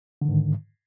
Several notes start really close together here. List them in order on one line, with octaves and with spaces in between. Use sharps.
D3 D#3 G#2